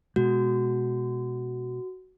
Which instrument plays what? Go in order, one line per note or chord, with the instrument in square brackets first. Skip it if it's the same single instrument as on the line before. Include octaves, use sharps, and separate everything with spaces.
[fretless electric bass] B2 G#3 [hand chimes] F#4